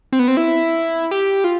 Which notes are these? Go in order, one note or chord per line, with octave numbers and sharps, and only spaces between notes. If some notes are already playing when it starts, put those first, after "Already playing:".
C4
B3
C4
E4
G4
F4